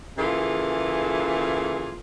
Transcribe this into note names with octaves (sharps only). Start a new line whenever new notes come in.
C#3 E3 A#3 F4 G#4 A4